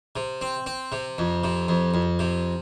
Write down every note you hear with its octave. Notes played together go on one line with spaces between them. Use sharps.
C3
C4
C4
C3
F2
C3
F2
F2
C3